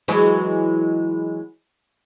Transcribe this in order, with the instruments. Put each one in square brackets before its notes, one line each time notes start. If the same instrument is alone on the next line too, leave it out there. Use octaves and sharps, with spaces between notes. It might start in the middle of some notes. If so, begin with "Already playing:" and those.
[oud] E3 F#3 G#3